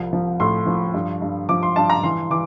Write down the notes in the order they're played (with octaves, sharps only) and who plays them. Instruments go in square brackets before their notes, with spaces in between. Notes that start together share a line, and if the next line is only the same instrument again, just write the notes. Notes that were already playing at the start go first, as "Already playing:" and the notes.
Already playing: [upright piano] C2 F3
F3
A2 C6
F3
G2
G2
F3 D6
C6
G2 A5
A#5
E3 C6
E3 D6